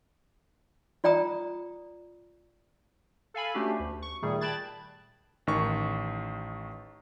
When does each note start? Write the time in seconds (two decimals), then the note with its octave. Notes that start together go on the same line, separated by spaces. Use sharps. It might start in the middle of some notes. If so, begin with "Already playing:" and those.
1.04 F4 D5 G5 A#5 D#6
3.34 A4 F5 G#5 B5
3.54 A3 C#4 D4 F#4 G4
3.80 D2
4.02 C#6
4.23 A#2 D#3 G3 A3 G#4
4.41 G5 A5 B5 F#6 G#6 A6
5.47 A1 D#3 C#6